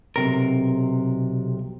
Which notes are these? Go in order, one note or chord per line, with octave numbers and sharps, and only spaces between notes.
B1 C3 A#4